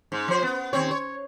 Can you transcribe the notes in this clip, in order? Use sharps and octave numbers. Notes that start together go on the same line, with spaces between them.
G#2
F3 C5
B3
D#2 C4 C#5
C#5